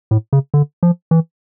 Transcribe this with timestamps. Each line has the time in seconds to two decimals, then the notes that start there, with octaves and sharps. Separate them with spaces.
0.11 A2
0.33 C#3
0.54 D3
0.83 F3
1.11 E3